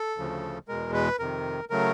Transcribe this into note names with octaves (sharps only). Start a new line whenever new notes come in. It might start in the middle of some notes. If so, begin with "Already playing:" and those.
Already playing: A4
D2 C#3 F3
E2 B2 G#3 A#4
B4
F2 C3 D#3 A#4
C#3 F#3 A3 A#4